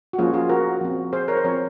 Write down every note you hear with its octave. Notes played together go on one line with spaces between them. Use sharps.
F#4
F3 A#3 C#4 F4 G#4
F4 G#4
F#4 A#4
F3 C4
G#4 C5
A#4 C#5
C5
F3 C4 A#4 C#5